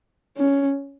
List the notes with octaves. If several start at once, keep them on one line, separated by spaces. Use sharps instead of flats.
C#4